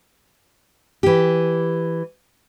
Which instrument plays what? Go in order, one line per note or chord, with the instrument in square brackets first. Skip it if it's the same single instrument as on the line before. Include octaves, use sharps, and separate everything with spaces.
[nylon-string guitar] E3 G4